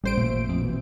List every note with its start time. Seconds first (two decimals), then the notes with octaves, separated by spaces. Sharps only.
0.04 A1 G3 C5 D7
0.17 A#2 A3
0.49 F2
0.61 B2 E3